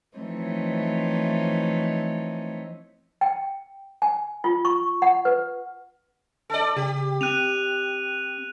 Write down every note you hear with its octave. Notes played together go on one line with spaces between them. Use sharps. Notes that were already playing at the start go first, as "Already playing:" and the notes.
E3 F3 A3 C4 D#4 C#5
G5
G#5
F4
C#6
F#5
B4
A4 D5
C#3 G4
C4 F#6 D#7 F7